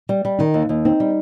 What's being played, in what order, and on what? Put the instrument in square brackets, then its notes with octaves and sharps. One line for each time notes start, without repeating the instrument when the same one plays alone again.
[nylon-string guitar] G3
G3
[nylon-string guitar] D#3 [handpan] D#4
[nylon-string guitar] D#2
D#2
[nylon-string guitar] C4 [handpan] D#4
[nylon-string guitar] G3